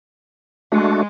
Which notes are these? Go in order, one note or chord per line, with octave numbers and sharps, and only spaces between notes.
G#3 A3 D4 F#4